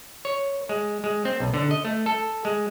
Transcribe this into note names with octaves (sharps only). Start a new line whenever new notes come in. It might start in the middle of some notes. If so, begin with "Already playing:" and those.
C#5
G#3
G#3
C4
B1
D3
D#5
A3
A4
G#3